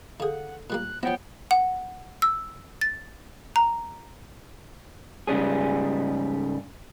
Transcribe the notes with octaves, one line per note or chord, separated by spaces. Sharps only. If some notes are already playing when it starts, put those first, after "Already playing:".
D3 G#4 A4 F5 F#5
A#2 G3 A#3 F#6
F3 B3 E4 C5 C#5 F#5 G5
F#5
E6
A6
A#5
G#2 C#3 G3 C#4 G#4